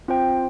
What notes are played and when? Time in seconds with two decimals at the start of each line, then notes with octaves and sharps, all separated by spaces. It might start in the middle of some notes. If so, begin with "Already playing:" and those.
0.08 C4 F4 C5 G5